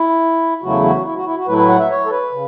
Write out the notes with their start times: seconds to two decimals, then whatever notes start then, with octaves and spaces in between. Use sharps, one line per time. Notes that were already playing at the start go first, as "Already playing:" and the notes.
Already playing: E4
0.62 E2 C#3 F#3 A3 E4 F#4
0.84 F#4
1.05 E4
1.16 F#4
1.26 E4
1.37 F#4
1.47 A2 F#3 A3 E4 B4
1.58 B4
1.69 F#5
1.79 E5
1.90 C#5
2.06 A4
2.11 B4
2.31 C#3